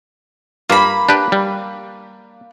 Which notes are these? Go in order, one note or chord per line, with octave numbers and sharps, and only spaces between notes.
G2 A#3 F4 B5
D4 G4 B4
G3